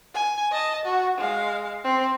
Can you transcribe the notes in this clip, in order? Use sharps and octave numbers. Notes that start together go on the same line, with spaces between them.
G#5
D#5 A5
F#4
G#3 F5
C4